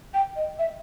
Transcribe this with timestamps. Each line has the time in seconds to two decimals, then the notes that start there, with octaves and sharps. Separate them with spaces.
0.13 G5
0.35 D#5
0.58 E5